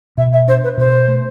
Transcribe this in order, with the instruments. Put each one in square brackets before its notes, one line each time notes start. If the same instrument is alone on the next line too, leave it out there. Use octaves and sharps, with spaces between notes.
[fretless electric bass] B2 [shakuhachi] E5
[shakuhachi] E5
[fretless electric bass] D4 [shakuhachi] C5
[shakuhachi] B4
[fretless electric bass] B2 [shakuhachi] C5
[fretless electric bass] A3